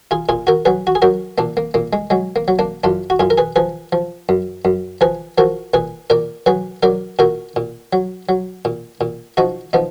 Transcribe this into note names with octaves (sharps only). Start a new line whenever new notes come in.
F4 G#4
A#2 F4 G#4
F#4 A#4
F#3 G#4 B4
F#4
G#4
F#3 F#4 A#4
A#2 A#3 D4
A#3
A#2 A#3
G#3
F#3 G#3
A#3
F#3
A#3 D4
F#2 D4 F4
F#4
F#2 F4 G#4
A#4
G#4 B4
F3 G#4 B4
F3
F#2
F#2
F3 G#4 B4
F3 F#4 A#4
A#2 G#4 B4
A#2 A#4 D5
F#3 G#4 B4
F#3 A#4 D5
A#2 F#4 A#4
A#2
F#3
F#3
A#2
A#2
F3 D#4 F#4
F3 B3 D#4